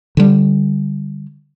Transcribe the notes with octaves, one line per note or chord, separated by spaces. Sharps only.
D3 G3